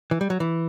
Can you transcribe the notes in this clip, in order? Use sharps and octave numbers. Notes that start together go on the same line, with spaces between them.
E3
G3
F#3
E3